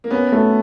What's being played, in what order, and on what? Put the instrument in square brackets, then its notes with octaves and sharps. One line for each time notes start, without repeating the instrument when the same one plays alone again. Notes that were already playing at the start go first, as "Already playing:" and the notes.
[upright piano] A#3
[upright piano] B3 [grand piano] C#4
[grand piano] A3